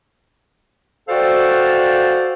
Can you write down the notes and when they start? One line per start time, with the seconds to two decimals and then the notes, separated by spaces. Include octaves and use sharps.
1.09 F#4 A4 C5 D5 F5 G5